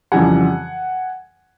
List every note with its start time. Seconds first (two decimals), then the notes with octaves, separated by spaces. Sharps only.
0.12 F2 C#3 E3 G3 F#5 G#5